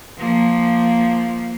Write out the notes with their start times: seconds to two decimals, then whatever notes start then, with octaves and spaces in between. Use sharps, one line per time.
0.18 F3 A#3